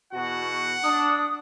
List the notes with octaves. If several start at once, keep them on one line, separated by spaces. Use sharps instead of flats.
E2 B2 F#4 F#5
D4 D#6